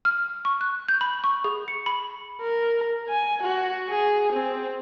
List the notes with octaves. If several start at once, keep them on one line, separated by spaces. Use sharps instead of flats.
F6
C#6
F#6
G6
B5
C#6
G#4
C#7
B5
A#4
G#5
F#4
G#4
C4